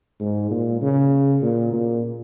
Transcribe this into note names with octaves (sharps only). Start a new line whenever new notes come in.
G#2
A#2
C#3
A#2
A#2